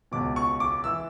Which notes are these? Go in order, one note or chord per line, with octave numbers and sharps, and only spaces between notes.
C#2 B2 D6
C#6
D6
E3 E6